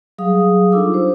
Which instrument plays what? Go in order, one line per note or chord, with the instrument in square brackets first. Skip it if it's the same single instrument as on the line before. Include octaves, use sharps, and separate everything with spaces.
[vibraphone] F#3 G3 G#4 F5 D#6
D4 D#4 F4 A4 D6 E6
G4 C5